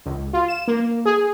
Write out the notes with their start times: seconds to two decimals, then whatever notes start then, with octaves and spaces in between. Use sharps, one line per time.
0.05 C#2
0.33 F4
0.48 E7
0.68 A#3
1.05 G#4